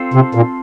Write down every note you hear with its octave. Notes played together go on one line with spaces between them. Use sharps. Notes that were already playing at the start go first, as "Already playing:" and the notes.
Already playing: C4 F4 A4 C5
C3
A#2